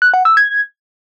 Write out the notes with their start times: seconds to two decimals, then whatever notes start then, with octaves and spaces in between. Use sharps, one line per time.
0.02 F#6
0.14 F#5
0.25 E6
0.37 G#6